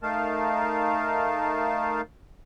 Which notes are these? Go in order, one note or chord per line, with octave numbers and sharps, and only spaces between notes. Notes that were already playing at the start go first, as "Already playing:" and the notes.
A3 D#4 A#4 F5 A5